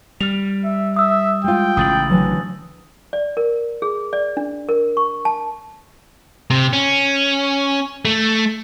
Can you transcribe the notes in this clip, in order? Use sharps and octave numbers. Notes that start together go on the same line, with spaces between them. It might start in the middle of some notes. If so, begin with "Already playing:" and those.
G3 F6 F7
E5
E5 D#6 E6
G#3 F4 G5
A1 C#3 D#6 A6 F#7
D3 E3 F#3
D5
A#4
G#4
D5
D4
A#4
C#6
A5
C3
C#4
A3